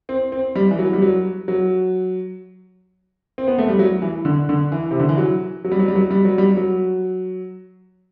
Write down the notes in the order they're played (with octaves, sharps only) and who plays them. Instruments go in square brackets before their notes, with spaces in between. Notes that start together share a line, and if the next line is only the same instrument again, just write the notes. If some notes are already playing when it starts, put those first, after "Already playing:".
[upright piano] C4
C4
G3
E3
F#3
G3
F#3
F#3
C4
B3
A3
G3
F#3
E3
D3
D3
E3
C3
D3
E3
F#3
F#3
G3
F#3
G3
F#3
G3
F#3
G3
F#3